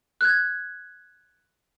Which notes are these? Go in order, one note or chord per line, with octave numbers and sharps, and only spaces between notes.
F#6 G#6